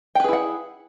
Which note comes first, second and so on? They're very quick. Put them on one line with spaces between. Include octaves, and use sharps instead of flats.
G5 B4 G#4 E4 F#5